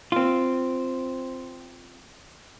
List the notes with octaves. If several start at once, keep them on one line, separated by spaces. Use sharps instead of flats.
C4 F4